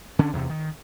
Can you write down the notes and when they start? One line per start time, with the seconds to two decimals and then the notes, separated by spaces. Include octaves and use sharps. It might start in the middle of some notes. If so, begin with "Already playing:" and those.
0.19 D3 C#4 D4
0.33 E2 C3
0.50 D#3